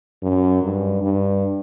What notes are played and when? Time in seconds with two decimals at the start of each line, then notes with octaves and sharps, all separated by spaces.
0.23 F#2
0.62 G2
1.03 G2